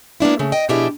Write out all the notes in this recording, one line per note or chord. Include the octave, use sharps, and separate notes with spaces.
A#3 B3 D4 E4
C#3 A3
D#5 G5
B2 F3 D4 E4 G4 G#4